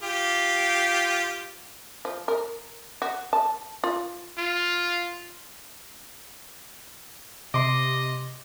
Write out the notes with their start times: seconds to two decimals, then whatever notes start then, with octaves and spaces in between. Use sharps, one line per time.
0.03 F4 G4
2.05 F3
2.28 A#4
3.02 F#4
3.33 A5
3.84 F4
4.38 F4
7.54 C3 D#5 C6 D6